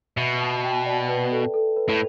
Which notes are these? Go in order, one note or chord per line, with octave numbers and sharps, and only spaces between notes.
B2 E5
A5
G5
D5
B4
A4
A4
B4
A2